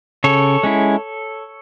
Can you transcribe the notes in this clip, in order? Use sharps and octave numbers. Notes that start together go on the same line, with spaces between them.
C#3 A4 C#5
G#3 C#4 E4